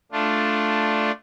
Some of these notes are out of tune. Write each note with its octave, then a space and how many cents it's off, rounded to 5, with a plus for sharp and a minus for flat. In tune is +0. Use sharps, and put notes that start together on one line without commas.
A3 +0 D4 +0 F4 +0